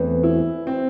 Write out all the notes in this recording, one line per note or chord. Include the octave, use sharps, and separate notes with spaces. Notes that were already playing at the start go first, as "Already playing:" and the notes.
Already playing: E2 E3 A3 C4
E4
C4